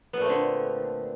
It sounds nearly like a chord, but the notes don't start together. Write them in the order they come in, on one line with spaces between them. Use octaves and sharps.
B3 A#2 A3 C4 D3